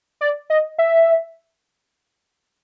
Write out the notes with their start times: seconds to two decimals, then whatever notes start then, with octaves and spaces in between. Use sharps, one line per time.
0.21 D5
0.50 D#5
0.79 E5